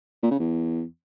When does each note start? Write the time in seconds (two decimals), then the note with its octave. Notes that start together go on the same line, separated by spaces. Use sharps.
0.23 A#2
0.31 C#3
0.39 E2